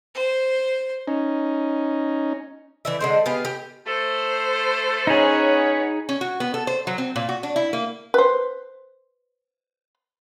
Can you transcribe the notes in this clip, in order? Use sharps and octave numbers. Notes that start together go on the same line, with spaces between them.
C5
C#4 D#4
E3 D5 E5
D3 G#3 C5
B3 G4 G#4 F5
G4
A3 A4 C5
C#4 D#4 F#4 G#4 B4 C#5
C#4
F#4
B3
A4
C5
F#3
C4
A#2
F#4
D4
E4
A#3
B4 C5